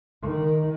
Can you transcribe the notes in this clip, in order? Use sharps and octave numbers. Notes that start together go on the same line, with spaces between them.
D#3